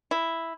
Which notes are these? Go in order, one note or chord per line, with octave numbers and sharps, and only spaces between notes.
E4